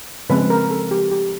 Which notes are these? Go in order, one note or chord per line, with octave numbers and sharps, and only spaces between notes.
C#3 F3 G#3 C4 B4
A#4
A4
G4
G4